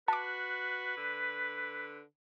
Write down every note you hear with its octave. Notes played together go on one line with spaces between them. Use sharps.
F#4 B4 A5 D6
D3